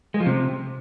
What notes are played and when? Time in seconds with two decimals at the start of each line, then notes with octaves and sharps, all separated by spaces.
0.14 G#3
0.20 F3
0.26 C3